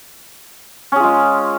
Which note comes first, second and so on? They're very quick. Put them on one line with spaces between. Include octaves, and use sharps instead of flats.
C#4 G#4 F4 G#3